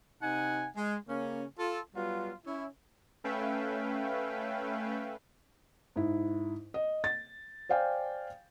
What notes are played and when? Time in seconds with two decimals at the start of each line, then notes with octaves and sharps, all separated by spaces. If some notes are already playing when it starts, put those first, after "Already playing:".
0.23 C3 D#4 F#5 G#5
0.77 G#3
1.09 C#3 A#3 C#4
1.59 F4 A4
1.95 F#3 G3 B3 F4
2.46 C#4 E4
3.24 A3 C#4 B4 E5 F5 G5
5.96 G#2 E4
6.74 D#5
7.04 A6
7.69 C5 D5 F5 G5 G#5